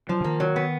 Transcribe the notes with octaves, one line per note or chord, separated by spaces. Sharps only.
F3 F#3
C#3
D#3 A#3
F#3
B3